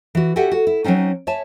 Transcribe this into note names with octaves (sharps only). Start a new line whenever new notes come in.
E3 F#4
F#4 G4 A4 E5 F#5 G#5
F#4
E4
F#3 A3 C4 C#4 D#4
C#5 E5 G#5 A5